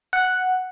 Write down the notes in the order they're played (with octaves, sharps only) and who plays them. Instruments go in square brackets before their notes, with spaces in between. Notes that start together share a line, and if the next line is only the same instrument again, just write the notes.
[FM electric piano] F#5